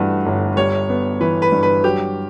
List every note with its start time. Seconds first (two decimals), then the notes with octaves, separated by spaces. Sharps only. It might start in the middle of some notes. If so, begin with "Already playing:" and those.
Already playing: G2 E3 A3 F#4 B4
0.26 G1
0.57 G3 C#5
0.89 B3
1.20 E3 B4
1.42 B4
1.52 G2
1.63 B4
1.84 F#3 G4